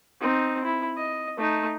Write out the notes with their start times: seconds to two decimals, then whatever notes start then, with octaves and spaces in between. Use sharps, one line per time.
0.21 C4 D#4
0.64 E4
0.97 D#5
1.37 A3 D#4